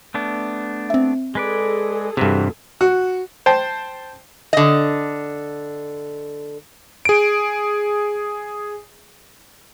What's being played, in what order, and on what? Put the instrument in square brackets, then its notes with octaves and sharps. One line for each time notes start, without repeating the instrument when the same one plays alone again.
[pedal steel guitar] A3 B3 D4
[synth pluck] C4 E5
[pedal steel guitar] G#3 B4 D5 [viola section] G#4 A4
[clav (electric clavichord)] G2 C3 [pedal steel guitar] E3 F#4
[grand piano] F#4
[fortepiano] C5 G5 A5
[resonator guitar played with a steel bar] D3 D#5
[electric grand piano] G#4 D7